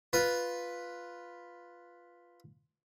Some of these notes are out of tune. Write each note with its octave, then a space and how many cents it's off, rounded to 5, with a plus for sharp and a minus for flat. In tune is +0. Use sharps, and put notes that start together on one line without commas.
F4 +0 B4 +0